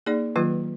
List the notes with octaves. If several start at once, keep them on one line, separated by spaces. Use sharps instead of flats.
A#3 D#4 G#4 D5
D#3 F#3 A#3 F4 B4